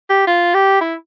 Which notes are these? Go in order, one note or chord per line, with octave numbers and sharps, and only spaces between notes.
G4
F4
G4
E4